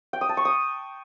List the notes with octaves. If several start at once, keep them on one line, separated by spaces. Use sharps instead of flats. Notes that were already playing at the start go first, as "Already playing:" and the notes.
G5
D#6
A5
C#6
D#6